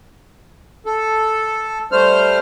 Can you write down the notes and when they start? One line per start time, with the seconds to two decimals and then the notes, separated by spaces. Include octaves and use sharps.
0.86 A4
1.92 G3 A3 C5 F6